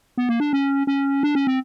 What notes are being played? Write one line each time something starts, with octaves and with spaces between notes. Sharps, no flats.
B3
A#3
D4
C#4
C#4
D4
C#4
C4